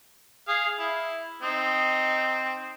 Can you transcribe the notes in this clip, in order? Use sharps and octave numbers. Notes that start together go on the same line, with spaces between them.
G#4 F5
E4
C4 D#4 D#6